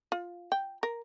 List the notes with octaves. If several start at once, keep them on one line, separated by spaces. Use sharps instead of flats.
F4
G5
A#4